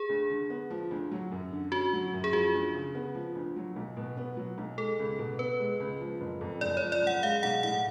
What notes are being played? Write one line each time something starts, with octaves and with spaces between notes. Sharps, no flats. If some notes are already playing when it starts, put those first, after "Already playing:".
Already playing: G#4
D2
D3
B3
F3
D2
F#3
F#2
D3
C#4 F#4
F#3
F#2
G#4
F3 F#4
D2
C#3
B3
F3
D2
F#3
B1
B2
B3
F#3
B1
G#3 A4
C#2
B2
B3 B4
G#3
C#2
F3
F#1
F2
F#1 D5
C#5
F3
D5
F#1 F#5
G#3 F5
B1 F#5
A2 F#5